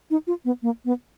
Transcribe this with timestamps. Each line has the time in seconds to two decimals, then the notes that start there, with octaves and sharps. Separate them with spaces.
0.11 D#4
0.27 F4
0.45 B3
0.63 A#3
0.85 B3